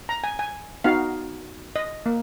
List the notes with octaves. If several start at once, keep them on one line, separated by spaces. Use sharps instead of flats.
A#5
G#5
G#5
B3 D#4 F#4 F5
D#5
A#3